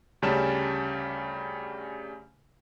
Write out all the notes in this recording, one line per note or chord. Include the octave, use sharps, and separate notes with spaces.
D2 C#3 G3 C#4 A5 E7